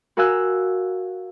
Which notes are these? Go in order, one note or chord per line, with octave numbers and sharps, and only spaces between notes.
F#4 A#4 F5 G#5 E6 F#6